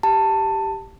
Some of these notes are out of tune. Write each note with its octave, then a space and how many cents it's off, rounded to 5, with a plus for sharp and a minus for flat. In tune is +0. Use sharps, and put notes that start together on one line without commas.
G4 +0 A5 +15